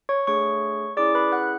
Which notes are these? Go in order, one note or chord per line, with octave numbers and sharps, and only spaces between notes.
C#5 C#6
A3 D4 G#4 C#5 C#6
C#4 E4 G#4 D5 D6
B4 B5
F#5 F#6